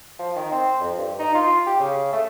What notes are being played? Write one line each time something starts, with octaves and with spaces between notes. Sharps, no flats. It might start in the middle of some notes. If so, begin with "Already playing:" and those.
F3
D#3
C4
F2
G2
D#4
F4
G4
C#3
A3